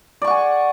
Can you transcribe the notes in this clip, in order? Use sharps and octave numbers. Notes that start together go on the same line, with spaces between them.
D5 F#5 G#5 C#6